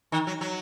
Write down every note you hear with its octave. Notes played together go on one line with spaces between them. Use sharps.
D#3
F#3
F#3